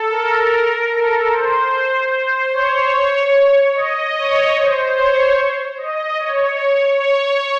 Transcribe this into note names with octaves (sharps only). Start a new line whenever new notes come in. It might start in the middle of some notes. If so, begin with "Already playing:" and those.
Already playing: A4
A#4
A4
C5
C5
C#5
D#5
C#5
C5
C#5
D#5
C#5
C#5